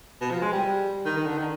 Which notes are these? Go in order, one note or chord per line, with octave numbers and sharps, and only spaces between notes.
B2
F3
G#3
G3
D#3
D#3
D3
D#3